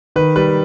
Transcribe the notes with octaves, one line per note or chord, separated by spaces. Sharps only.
D#3 B4
G3 B4